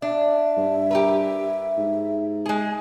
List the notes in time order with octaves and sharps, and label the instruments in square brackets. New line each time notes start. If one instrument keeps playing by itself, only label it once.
[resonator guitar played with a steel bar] D4 [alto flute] E5
[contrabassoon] G2
[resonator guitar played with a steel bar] G4 A#4 B4
[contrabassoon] G#2
[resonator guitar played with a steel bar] G#3 G#4